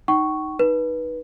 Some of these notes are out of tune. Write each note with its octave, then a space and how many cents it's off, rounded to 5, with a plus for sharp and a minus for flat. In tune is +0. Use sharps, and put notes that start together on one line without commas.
D#4 +0 G5 -45 C#6 +0
D#4 +0 B4 -20